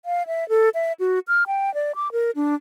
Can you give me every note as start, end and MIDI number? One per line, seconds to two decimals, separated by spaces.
0.05 0.27 77
0.27 0.48 76
0.49 0.69 69
0.74 0.93 76
1.00 1.19 66
1.28 1.44 89
1.47 1.73 79
1.74 1.92 74
1.96 2.12 86
2.12 2.31 70
2.36 2.55 62